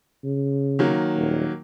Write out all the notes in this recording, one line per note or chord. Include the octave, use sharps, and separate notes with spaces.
C#3
D#3 F#3 A#3
D#1